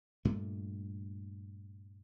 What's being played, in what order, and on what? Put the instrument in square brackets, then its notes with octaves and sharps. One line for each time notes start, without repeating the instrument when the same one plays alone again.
[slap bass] G2 A#2 A3